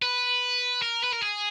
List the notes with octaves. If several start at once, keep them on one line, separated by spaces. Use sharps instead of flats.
B4
A#4
B4
A#4
G#4